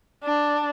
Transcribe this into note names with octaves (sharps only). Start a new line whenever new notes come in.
D4